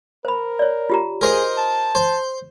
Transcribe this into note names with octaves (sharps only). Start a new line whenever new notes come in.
A#4 C5 B5
C#5 D5
F4 G4 A#5
G#4 A#4 C5 D#5
A5
C5